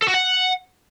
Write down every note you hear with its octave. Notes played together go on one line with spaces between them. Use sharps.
A4
F#4
F#5